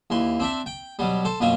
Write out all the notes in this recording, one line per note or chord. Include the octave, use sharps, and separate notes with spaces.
D#2 E3 C6
C4 D4 E5
G5
B2 F#3 G3
A4 C5
F#2 B2 F#3 A#3 F4